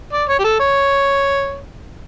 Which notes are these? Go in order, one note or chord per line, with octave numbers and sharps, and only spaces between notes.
D5
C#5
G4
A4
C#5